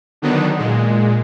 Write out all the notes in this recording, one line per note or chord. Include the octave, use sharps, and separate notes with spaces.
D3 D#3 F#3 B3 D4 D#4
A#2 G#3